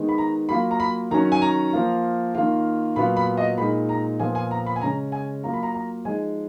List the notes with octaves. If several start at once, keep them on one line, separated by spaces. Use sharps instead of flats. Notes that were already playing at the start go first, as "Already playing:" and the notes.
Already playing: D#3 G#3 B3 D#4
B5
A#5
F#3 A#3 F4 B5
A#5
B5
D#3 F#3 C#4 A#5
G#5
A#5
F3 A#3 F4
D#3 A#3 F4
A#2 F#3 B3 F4 B5
B5
D#5
A#2 G#3 D#4 B5
A#5
A#2 F3 B3 F4 G#5
G#5
A#5
B5
G#5
C#3 G#3 C#4 A#5
G#5
F#3 A#3 F4 A#5
B5
A#5
A#5
F3 G#3 D#4 G#5